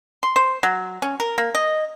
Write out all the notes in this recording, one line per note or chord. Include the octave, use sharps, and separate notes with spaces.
C6
C5
F#3
C#4
A#4
A#3
D#5